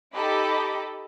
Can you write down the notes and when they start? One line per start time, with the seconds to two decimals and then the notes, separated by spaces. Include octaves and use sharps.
0.14 D#4 G4 A4 D#5 B5 D6